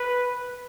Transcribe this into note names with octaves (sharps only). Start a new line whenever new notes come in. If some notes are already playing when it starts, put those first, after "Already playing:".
Already playing: B4